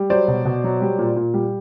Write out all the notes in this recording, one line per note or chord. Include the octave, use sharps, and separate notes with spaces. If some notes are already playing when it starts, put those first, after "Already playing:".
Already playing: G3
F#3 C5 D5
B2
B2
F#3
G3
A#2
A#2
G3